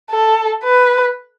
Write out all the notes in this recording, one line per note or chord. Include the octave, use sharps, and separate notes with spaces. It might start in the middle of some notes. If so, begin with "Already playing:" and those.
A4
B4